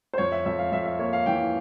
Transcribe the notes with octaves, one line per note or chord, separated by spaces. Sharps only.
C5
F2 C#5
E5
F2 E5
F5
F2 E5
E5
A#3 C#5
F5
E3 G5